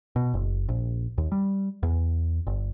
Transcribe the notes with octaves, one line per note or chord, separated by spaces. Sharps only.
B2
F#1
A#1
D#2
G3
E2
G1